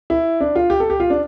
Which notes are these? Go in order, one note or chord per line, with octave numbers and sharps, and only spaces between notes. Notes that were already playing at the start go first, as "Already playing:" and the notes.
E4
D4
F4
G4
A4
G4
F4
D4